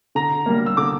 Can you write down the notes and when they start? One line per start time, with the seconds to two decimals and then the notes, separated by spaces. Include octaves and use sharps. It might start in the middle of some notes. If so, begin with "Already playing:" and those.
0.15 D3 A#5
0.46 G3 A#3
0.66 E6
0.77 D3 D6